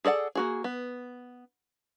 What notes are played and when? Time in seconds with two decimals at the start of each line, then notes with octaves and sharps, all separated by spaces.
0.05 G#4 A4 D5 F#5
0.35 A#3 F#4 G#4
0.64 B3